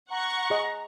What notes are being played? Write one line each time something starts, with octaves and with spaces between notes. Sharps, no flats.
F#5 A#5 C#6
G#4 D#5